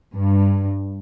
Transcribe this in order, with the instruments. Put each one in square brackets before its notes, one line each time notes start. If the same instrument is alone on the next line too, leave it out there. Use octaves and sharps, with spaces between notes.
[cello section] G2